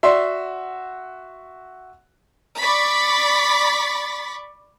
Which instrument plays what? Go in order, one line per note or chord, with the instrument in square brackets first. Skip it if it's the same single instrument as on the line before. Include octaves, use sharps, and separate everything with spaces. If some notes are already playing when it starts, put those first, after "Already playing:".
[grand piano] F#4 E5 C6 [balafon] D5
[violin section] D5 B5 C#6 A6 B6